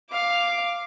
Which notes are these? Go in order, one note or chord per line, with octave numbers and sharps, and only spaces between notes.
F5 D6